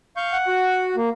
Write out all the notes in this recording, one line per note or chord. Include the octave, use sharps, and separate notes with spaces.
F5 C#6 G6
F#5
F#4
A#3